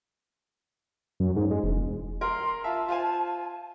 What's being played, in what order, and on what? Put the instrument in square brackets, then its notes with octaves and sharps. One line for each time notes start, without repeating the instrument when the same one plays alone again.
[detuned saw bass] F#2
G#2
G#3
E1
[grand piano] A#4 [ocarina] C6
[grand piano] F4 E5 [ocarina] A5
[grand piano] F4 C5 G#5